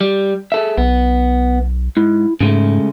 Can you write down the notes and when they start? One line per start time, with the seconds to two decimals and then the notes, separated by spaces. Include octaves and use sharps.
0.01 G3
0.52 G#4 A4 E5
0.78 B1 B3
1.97 G#2 E4
2.40 G#2 C#3 G#3 A3